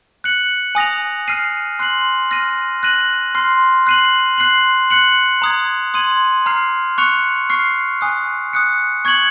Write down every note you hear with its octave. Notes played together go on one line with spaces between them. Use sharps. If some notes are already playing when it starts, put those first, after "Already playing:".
F#6 C#7 F#7
G#5 D#6 A#6 F7
F6 C7 D#7
C6 F#6 C7 F#7
F6 A#6 D#7
F#6 A#6 D#7 F#7
C6 F6 C7
F#6 C7 D#7 F#7
C6 F#6 C7 F#7
F#6 C#7 F#7
A#5 D#6 G#6
C6 D#6 G#6 D#7 F#7
A#5 F6 C7
C#6 F#6 C#7 F7
C#6 F6 C7
G#5 D#6 F#6
D#6 F#6 C#7
C#6 G#6 C#7 F#7